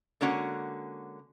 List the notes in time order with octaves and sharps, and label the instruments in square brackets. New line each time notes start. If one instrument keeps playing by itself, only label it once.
[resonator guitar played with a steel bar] D3 G#3 A#3 C#4 F#4 F#5